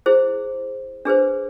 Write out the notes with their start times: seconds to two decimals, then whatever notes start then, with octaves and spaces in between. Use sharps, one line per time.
0.06 E4 G#4 C5
1.05 D4 G#4 B4 C5